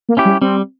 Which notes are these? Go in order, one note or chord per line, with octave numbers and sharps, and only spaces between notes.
A#3
C#4 E4 G4
G3
G3 C4